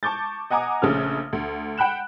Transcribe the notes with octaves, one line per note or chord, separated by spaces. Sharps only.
A5 C#6 D6 G6 A6
D#5 F#5 G#5 A#5 D6 D#6
A#1 C#3 A3 F6
D2
F#5 G5 B5 F#6 E7